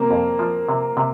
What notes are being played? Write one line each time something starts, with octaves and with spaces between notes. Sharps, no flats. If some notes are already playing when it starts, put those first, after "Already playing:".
Already playing: C3 A#3 C4
F2
F3
C3
C3